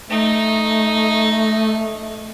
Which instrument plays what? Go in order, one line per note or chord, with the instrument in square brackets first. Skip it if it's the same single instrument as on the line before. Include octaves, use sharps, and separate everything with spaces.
[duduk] A3 [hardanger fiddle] D#4